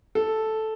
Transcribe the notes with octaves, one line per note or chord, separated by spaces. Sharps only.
A4